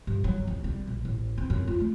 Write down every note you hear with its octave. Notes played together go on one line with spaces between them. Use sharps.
G2
F#3
C2
G3
A#1
A1
C4
F#2
F4
A3